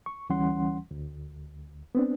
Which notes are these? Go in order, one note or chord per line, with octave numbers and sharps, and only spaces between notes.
C#6
D2 E3 G3 C#4 F#5 C6
D2
B3 C4 D4